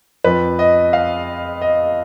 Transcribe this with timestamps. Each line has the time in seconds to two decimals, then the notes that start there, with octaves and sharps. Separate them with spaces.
0.24 F2 F3 B4
0.59 D#5
0.93 F5
1.62 D#5